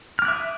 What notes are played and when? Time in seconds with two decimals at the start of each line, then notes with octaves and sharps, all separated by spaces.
0.19 F6
0.22 D6
0.25 F#6
0.28 E5
0.31 D#6